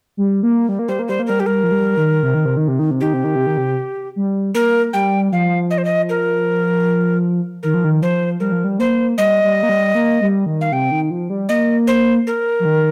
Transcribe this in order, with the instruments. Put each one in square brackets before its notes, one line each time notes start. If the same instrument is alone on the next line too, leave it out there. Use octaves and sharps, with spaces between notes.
[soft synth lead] G3
A#3
G3
A#3
[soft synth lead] G3 [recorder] C5
[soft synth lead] A#3
[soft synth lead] G3 [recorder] C5
[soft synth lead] A#3
[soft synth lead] G3 [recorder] A#4
[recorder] G4
[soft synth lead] G3 [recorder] A#4
[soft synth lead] F3
G3
D#3
C3
D#3
C3
D#3
C3
D#3
C3
[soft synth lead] D#3 [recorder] G4
[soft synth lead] C3
D#3
C3
D#3
C3
G3
[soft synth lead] A#3 [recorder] A#4
[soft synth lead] G3 [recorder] G5
[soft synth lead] F3 [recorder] F5
[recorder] D#5
C5
D#5
A#4
[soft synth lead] D#3 [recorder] A#4
[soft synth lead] F3
D#3
[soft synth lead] F3 [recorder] C5
[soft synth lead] G3 [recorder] A#4
[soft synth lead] F3
G3
[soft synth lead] A#3 [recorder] C5
[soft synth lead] G3 [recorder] D#5
[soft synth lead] G3
A#3
G3
A#3
G3
D#3
[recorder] F5
[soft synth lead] C3 [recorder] G5
[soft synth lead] D#3
F3
G3
[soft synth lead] A#3 [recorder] D#5
[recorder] C5
A#4
[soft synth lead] F3
D#3